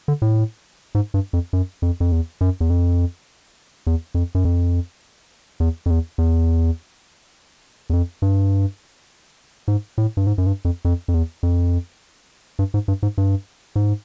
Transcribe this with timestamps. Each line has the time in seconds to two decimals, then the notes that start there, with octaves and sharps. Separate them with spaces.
0.08 D3
0.22 A2
0.95 G#2
1.14 G2
1.33 F2
1.53 F#2
1.82 F2
2.00 F2
2.12 E2
2.41 F#2
2.60 E2
2.70 F2
3.87 E2
4.14 F2
4.35 F#2
4.45 F2
5.60 E2
5.86 F2
5.90 E2
6.18 E2
7.90 E2
7.93 F2
8.22 G2
9.68 G#2
9.98 A2
10.17 G2
10.27 G#2
10.38 F#2
10.46 G2
10.65 F2
10.85 F2
11.08 F2
11.14 E2
11.43 F2
12.59 G2
12.74 G#2
12.88 G2
13.03 G#2
13.18 G2
13.76 G#2